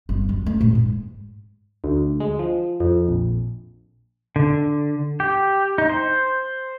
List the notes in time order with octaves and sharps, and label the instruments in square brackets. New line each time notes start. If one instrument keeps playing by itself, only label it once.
[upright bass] G1
F#2
A3
A2
G#2
[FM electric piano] D2
G#3
F3
F2
A#1
[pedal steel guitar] D3
G4
D#4
C5